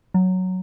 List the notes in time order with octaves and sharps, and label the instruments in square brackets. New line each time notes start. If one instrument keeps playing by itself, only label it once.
[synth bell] F#3